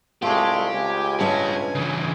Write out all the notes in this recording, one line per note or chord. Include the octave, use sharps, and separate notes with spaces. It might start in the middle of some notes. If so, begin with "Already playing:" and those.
C2 G#3 A3 F4 G4
C#2 G#5
G2 C#4 B4 E5 A5
C#3 E3